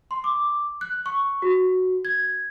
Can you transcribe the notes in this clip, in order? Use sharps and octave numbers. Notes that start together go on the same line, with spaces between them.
C6
D6
F#6
C#6
F#4
G#6